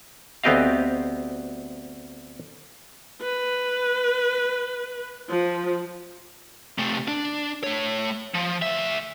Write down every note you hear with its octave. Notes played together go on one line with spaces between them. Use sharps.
D2 B3 C4 G4 D#5 F5
B4
F3
C3 A3
D4
A3 C#5
F3
D2 E5